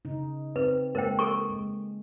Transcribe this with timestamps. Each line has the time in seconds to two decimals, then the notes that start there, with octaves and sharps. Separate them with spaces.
0.05 C#3 D#4
0.56 C4 B4
0.95 G#3 A#3 A#4 C5 G5
1.19 A4 A#4 C#6
1.50 G#3